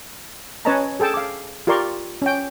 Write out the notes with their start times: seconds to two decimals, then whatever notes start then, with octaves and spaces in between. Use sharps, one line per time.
0.65 C#4 B4 C#5 D#5 A5 A#5
1.00 G#4 A4 G5 A5
1.14 F5 D6
1.67 F4 G4 A#4 D5 C6 C#6
2.22 C#4 G5